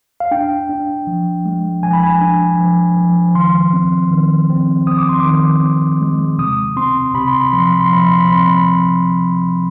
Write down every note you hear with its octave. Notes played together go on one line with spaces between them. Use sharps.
F5
D4 G5
D4
F3
G#3
F3 G#5
B5
G#5
D4
F3
F3
D#3 C6
C4
D#3
C4
C4 D#6
D6
C6
D6
D#3
C4
G#3
C3 D#6
C4 C6
C3 B5
C6
B5
F3 C6
B5
C6
F3 B5
C6
B5
C4 C6
B5